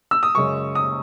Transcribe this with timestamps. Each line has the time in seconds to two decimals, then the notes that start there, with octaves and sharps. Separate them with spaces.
0.11 E6
0.23 D#6
0.35 F#2 C#3 G#3 C#4 C#6
0.75 D#6